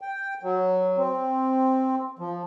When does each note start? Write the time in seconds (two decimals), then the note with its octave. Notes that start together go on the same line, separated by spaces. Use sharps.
0.01 G5
0.43 F#3
0.98 C4
2.19 F3